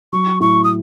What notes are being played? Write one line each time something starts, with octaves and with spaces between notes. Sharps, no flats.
F#3 C#6
A2 C#6
D#6